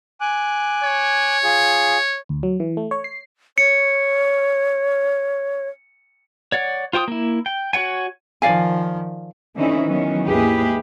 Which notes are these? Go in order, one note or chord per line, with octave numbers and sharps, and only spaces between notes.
G#5 D6 F#6
C#5
F4 G#4
D2
F#3
E3
A3
C#5
C7
C#5 C#7
C#5 D5 F#5
F4 C5 G5 C#6 D#6
A#3 E4
G5
F#4 C#5 F#5 G#5
D#3 F3 D5 F5 G#5
D3 E3 C4 C#4 D#4 E4
D#3 E3 F#3 B3 C#4
D#2 G#2 E4 G4 G#4 B4